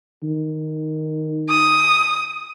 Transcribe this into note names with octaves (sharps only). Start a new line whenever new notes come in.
D#3
D#6